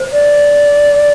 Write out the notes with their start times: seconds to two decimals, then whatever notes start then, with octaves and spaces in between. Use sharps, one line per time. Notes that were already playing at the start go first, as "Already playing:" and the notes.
Already playing: C5
0.12 D5